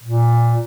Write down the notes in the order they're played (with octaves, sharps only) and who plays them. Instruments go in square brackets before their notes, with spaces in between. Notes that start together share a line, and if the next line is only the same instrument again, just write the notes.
[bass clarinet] A#2